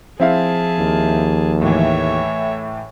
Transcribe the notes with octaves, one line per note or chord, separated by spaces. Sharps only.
F3 C4 E4 G#4 F5 A5
D#2
A2 E3 C#5 E5